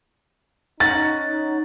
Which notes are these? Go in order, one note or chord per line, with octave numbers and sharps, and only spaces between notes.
C#4 D#4 F#5 A#5 A6